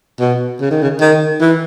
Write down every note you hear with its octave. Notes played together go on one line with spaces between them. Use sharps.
B2
C#3
D#3
C#3
D#3
E3